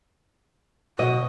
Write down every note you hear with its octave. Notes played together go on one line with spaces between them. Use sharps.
B2 F#4 D#5